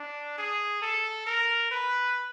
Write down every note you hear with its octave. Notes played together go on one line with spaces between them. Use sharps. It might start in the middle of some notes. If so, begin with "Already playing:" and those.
Already playing: D4
G#4
A4
A#4
B4